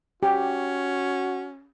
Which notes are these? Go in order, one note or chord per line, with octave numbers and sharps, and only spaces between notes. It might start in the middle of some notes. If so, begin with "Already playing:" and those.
C#4 F#4 G4